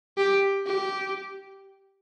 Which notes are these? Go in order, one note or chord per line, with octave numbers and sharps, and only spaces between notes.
G4
G4